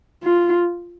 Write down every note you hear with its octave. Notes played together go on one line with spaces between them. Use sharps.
F4